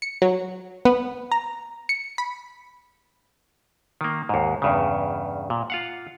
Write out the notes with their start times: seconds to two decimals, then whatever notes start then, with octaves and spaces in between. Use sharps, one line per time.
0.02 C#7
0.22 F#3
0.85 B3
1.31 A#5
1.89 C#7
2.18 B5
4.01 D#3 A#3
4.29 D#2 G#2
4.62 E2 G2 C#3
5.50 A#2
5.70 F4 F5 F#5